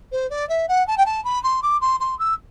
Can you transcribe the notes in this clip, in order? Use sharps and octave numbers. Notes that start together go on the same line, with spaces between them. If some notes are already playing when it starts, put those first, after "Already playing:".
C5
D5
E5
F#5
A5
G5
A5
B5
C6
D6
C6
C6
E6